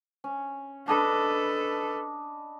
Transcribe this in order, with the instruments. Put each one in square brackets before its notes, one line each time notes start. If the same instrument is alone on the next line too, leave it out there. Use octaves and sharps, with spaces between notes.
[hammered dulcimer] C#4
[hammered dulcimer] D4 D#5 B5 [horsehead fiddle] A4 B4